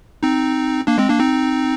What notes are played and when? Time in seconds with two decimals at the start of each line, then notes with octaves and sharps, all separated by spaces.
0.23 C4 D#4
0.87 A#3 D4
0.98 G#3 C4
1.09 A#3 D4
1.20 C4 D#4